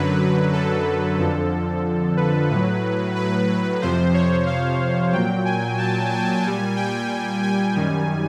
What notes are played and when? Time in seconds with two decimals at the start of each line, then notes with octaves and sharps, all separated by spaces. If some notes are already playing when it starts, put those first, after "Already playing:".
Already playing: F#2 D3 F#3 B4
0.53 A4
1.19 F2 D3 F3 A4
2.17 B4
2.50 A2 F#3 B4
3.16 B4
3.82 F2 C3 F3 C5
4.14 C#5
4.47 F5
5.13 A#2 F#3 G5
5.45 G#5
5.78 A5
6.11 G#5
6.44 A#2 G3
6.77 G5
7.43 G#5
7.75 F#2 D#3 G3